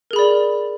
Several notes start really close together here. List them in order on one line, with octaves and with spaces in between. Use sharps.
A#4 G#4 B5 D5